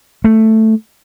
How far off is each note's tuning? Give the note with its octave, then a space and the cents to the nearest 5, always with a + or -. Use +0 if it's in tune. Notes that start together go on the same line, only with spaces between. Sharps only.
A3 +5